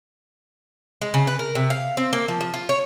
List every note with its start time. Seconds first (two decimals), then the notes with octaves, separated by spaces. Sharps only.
1.02 G#3
1.14 C#3
1.27 B4
1.39 A#4
1.55 C3
1.70 F5
1.97 C4
2.13 A#3
2.28 F3
2.41 F3
2.54 F4
2.69 C#5